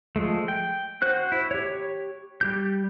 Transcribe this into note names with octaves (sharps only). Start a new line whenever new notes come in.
F3 G#3 A3
G5
F#4 C5 F#6
E4
G4 C#5
G3 G4 G6